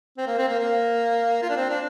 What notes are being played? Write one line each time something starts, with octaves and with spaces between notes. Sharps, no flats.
C4
A#3
C4
A#3
A#3
F4
D4
C4
D4